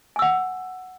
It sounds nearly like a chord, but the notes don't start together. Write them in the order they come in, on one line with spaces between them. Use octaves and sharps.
G#5 E6 F#5